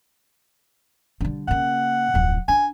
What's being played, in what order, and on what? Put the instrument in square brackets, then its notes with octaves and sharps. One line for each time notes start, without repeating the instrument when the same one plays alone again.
[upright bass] D3 G3
[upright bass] C#3 A#3 [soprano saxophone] F#5
[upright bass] D1 F2
[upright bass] D4 [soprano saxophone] G#5